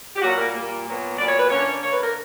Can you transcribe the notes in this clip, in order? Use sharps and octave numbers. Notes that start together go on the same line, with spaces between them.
G4
A#2 F#3 G3 A#3 F#4
A#3 A#4
A#2 G3 A#3
A#2 F#3 B3
A#2 F#3 B3 D5
C#5
B4
D3 A#3 C#4 C#5
D3 A#3 C#5
B4
A#4